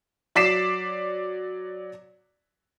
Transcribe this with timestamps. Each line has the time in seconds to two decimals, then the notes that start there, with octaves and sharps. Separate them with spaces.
0.35 F#3 D5 D6 B6 C7 E7